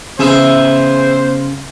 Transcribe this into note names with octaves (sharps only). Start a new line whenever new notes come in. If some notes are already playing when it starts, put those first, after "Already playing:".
C#3 E3 B3 G#4 C5 E5